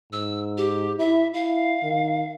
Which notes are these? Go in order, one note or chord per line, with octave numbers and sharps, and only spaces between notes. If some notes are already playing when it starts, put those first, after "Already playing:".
G#2 E6
G4
E4 E5
E4 F5
D#3